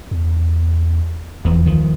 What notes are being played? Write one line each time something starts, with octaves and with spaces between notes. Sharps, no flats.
E2
F1 E2 E3 F3
C#2 D#3 F3